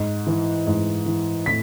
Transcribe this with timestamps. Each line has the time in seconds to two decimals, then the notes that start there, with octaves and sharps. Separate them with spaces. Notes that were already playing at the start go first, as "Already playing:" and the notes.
Already playing: G#2
0.27 E3
0.67 G#2
1.06 E3
1.46 A2 B6